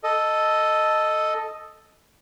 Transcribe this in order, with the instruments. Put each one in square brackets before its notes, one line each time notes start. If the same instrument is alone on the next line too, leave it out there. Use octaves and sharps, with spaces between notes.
[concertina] A4 D#5